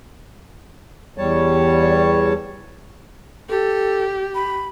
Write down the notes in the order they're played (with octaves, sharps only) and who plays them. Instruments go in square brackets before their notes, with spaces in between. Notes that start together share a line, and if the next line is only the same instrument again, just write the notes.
[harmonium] E2 G3 C#5 A5
[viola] G4 [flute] A4
[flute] B5